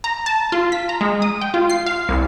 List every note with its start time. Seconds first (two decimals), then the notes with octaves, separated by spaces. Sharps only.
0.04 A#5
0.26 A5
0.52 F4
0.72 B6
0.89 A#5
1.01 G#3
1.22 D#6
1.41 G5
1.54 F4
1.70 C7
1.86 F5
2.09 C2